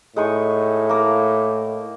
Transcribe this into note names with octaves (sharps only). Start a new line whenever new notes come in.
A2 G#3 D#4 C#6
A#3 A#4